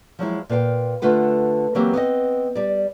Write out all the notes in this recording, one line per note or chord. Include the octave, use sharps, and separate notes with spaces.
F3 F#3 G#3 E4
A#2 B4 F5 G5
D3 A3 F4 B4 F#5
E3 F#3 A#3 C4 G4
B3 C4 C5 D#5
G3 D5